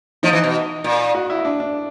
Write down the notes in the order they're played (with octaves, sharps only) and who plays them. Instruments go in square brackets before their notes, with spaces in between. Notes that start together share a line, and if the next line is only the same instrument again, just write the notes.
[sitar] F3 [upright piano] D#4
[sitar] E3
B2
A#2
[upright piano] F#4
E4
D4
D4